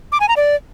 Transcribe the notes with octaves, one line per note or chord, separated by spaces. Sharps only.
D6
G#5
A#5
D5